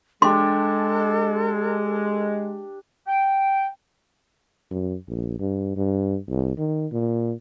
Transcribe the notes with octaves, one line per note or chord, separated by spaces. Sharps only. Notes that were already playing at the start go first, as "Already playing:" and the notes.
G#3 D4 G4 A4 C6
G5
F#2
A#1
G2
G2
C2
D#3
A#2